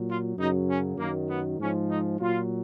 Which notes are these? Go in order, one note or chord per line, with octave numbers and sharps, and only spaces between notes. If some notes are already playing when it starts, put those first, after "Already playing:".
Already playing: A#2 F#3
F4
F#2 C#3 F#3 D#4
C#4
F#2 D#3 F#3 A#3
B3
G#2 F3 G#3 C#4
D#4
A#2 F#3 F4